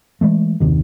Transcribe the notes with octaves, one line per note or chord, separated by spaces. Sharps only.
E3 G#3 A3
F#1 D#2 C3 D#3